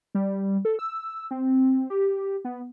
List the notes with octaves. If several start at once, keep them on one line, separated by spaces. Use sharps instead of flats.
G3
A4
E6
C4
G4
B3